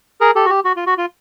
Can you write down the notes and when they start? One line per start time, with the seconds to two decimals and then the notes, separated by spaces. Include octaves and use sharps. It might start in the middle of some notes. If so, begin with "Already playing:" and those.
0.21 G#4 A#4
0.35 G4 A4
0.46 F#4
0.50 G4
0.65 F#4
0.77 F4
0.87 F#4
0.98 F4